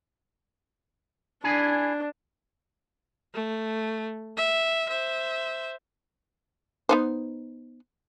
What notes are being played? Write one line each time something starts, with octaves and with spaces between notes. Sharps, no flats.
D4 E4 G#4 G#5
A3
E5
C5 E5
B3 D#4 C5